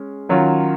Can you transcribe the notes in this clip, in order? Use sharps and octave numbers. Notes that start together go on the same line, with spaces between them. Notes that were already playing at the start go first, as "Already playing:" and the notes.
Already playing: G#3 C#4
D#3 F#3 C#4 F4